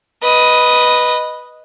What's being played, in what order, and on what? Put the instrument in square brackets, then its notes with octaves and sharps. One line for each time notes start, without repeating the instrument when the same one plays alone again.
[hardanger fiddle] B4 D#5